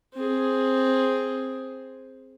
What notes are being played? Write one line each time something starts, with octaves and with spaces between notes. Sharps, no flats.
C4 G#4